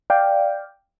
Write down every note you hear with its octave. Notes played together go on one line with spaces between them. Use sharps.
D5 F5 G5